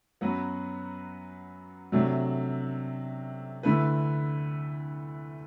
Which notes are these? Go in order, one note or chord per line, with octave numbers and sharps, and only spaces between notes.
F#2 F#3 B3 F#4 B4
C3 F#3 A3 D4
D2 D3 A3 E4 B4